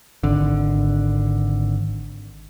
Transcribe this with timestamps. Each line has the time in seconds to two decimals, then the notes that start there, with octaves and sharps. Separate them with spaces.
0.23 G#1 D3